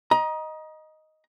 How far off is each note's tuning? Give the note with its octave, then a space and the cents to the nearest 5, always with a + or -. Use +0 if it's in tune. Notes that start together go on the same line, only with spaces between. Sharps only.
D#5 +0 A#5 +30